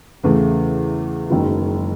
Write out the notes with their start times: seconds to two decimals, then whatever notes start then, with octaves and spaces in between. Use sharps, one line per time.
0.23 E2 C#3 E3 A3
1.30 F#1 F#2 D#3 G#3